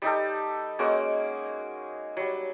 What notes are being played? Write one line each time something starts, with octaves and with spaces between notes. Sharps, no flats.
G3 D#4 G4 A4
G#3 A#3 C#4 F#4
F#3 G3